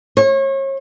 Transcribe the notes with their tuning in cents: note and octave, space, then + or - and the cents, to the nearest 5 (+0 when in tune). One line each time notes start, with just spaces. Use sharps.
C#5 -35